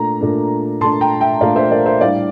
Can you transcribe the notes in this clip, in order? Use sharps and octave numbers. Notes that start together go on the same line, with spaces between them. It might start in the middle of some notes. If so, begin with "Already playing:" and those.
Already playing: A#2 A3 D4 A#5
A#2 A3 D4
A#2 A3 D4 A5 C6
G5 A#5
E5 G5
A#2 A3 D4 D5 F5
C5 E5
A#4 D5
C5 E5
A2 G3 D4 D5 F5